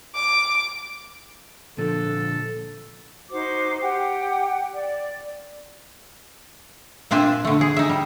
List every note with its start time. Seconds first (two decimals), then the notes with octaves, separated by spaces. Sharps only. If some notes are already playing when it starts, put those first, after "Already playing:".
0.15 D6
1.78 A#2 D3 F3 A4
3.31 D#4 F#4 C5 D6
3.80 G4 F#5 G5
4.73 D5
7.11 A#2 C4 D4 E5 G#5 A5
7.45 D3 A3
7.61 G#4
7.76 D#4 E5
7.89 G3